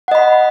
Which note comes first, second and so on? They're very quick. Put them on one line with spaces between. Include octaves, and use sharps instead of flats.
F#5 D#5 B5